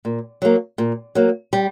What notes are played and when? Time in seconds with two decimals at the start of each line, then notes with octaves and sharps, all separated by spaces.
0.05 A#2
0.42 F#3 A#3
0.78 A#2
1.15 F#3 A#3
1.53 G3